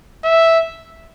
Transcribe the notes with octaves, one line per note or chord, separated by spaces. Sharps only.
E5